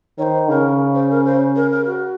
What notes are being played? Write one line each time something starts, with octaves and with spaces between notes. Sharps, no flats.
D#3 C5 C#5
C#3 A#4
C5
A#4
C5
A#4
A#4
F#4